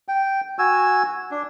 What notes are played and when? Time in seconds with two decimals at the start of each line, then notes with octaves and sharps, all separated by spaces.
0.08 G5
0.59 F#4 G#5 E6
1.31 D4